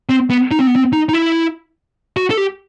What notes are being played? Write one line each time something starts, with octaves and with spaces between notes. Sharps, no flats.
C4
B3
D#4
C4
B3
C4
D#4
D#4
E4
F#4
A4
G4